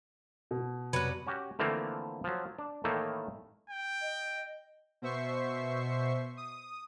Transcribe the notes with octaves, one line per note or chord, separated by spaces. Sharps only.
B2
F2 C3 F#3 G3 B4 F#5 G#6
C#4 F#4 G4
D3 E3 F3 A3 A#3 C4
F3 F#3
D4
A2 D#3 E3 A3 A#3
G5
D#5
B2 C5 E5 C#6 C7
D#6